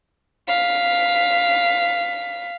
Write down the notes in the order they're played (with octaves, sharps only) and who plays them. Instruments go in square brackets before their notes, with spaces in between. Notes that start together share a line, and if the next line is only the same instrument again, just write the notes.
[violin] F5 B6